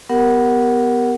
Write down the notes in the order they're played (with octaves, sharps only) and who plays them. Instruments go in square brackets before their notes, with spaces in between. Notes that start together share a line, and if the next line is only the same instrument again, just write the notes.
[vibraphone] B3 G4 A#4 F#5